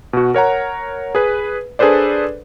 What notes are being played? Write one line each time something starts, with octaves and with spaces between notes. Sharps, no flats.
B2 F#4
A#4 C#5 F#5 A#5
G#4 B4
D4 G#4 A4 B4 C5 D5